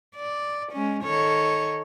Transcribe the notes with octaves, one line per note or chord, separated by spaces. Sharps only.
D5
G#3 C#4
D#3 A4 C#5